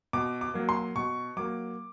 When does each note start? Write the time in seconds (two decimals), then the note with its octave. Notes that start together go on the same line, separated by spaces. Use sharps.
0.13 B2 D6
0.41 D6
0.54 F#3 A#3
0.69 C6
0.96 B2 C#6
1.37 F#3 A#3 D6